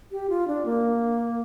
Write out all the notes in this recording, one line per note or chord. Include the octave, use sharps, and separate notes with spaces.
G4
F4
D4
A#3